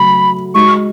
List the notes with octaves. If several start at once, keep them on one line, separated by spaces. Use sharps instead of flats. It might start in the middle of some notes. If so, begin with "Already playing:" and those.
Already playing: C#3 F#3 A3 B5
G#3 D#4 F#4 C#6